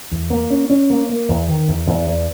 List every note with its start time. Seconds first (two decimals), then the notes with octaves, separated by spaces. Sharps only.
0.11 E2
0.30 A#3
0.50 C#4
0.70 C#4
0.90 A#3
1.09 A#3
1.28 E2
1.48 D#3
1.68 E2
1.87 E2
2.06 E2